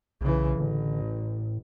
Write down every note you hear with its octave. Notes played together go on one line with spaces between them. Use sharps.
B1 C#3 E3
A1 D3
A2